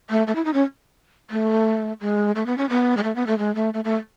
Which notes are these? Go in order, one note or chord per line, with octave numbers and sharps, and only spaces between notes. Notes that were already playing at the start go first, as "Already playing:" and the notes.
A3
A3
E4
D#4
C#4
A3
G#3
A3
B3
C#4
B3
G#3
A3
B3
A3
G#3
A3
A3
A3